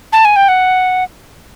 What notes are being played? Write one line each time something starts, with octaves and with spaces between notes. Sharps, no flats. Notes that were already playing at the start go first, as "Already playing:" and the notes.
A5
G#5
G5
F#5